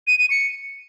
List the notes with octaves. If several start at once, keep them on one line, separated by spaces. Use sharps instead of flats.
D#7
D#7
C#7